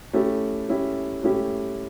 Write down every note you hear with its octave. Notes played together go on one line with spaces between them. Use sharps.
A3 C#4 E4 G4
A3 C#4 E4 G4
A3 C#4 E4 G4